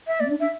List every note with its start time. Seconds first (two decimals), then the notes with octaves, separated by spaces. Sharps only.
0.07 E5
0.20 A#3 D5
0.26 C4
0.30 D4
0.40 D4 E5